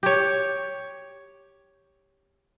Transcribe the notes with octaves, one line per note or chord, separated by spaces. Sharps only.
G4 C#5